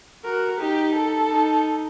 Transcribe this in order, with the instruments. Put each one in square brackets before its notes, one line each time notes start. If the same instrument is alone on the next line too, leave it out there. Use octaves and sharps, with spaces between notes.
[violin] F#4 [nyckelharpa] A#4
[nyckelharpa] D#4 [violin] G4
[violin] A4
[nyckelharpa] D#4